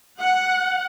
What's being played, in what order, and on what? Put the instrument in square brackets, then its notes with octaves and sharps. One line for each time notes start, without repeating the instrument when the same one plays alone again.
[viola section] F#5